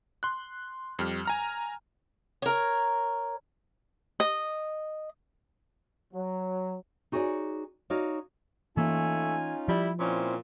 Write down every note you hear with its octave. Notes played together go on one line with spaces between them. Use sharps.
C6 F#6
F2 G3 F6
G#5 A#5 F6
A#4 C#5
D#5
F#3
D#4 F#4 G#4 B4 C#5 D5
D#4 F#4 C#5 D5 F5
E3 A3 A#3 C#4 D#4 F4 G#5
F3 G3 E4
A#2 C4 C#4 E4 C5